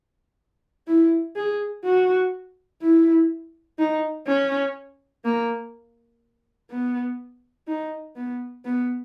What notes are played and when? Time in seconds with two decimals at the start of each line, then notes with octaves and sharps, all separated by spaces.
0.87 E4
1.36 G#4
1.84 F#4
2.82 E4
3.79 D#4
4.27 C#4
5.25 A#3
6.70 B3
7.67 D#4
8.16 B3
8.65 B3